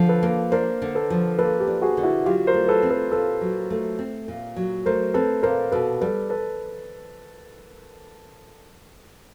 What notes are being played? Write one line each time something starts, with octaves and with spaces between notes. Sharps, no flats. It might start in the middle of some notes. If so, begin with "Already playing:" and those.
Already playing: D3 F3
A4 B4
A#3
D4 A#4 C5
D3
A4 B4
F3
A#3 A4 B4
G4 A4
D4
F#4 G#4
D3
E4 F#4
F#3 F4 G4
A#4 C5
A3
A4 B4
C4
A4 B4
A#2 A4 B4
F#3
A3
C4
A#2
F#3
A3 A#4 C5
C4 A4 B4
A#2 A#4 C5
B2 A4 B4
G3 A4 B4
A4 B4